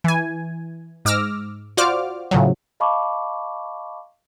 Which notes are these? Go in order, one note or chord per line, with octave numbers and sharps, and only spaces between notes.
E3 G#5
G#2 D6 E6 F6 A#6
F4 F#4 C5 D5 D6 F6
A2 C#3 F3 F#3
D#5 F5 A5 B5 C#6 D6